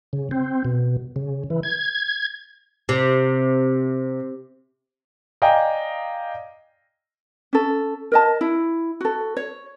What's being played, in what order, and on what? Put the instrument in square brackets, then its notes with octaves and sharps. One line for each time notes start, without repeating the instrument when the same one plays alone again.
[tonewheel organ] C#3
C4
B2
C#3
E3
G#6
[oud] C3
[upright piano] D5 D#5 F5 G5 G#5 A#5
[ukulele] C#4 A4
A#4 D#5 A5
E4
F#4 A4
C#5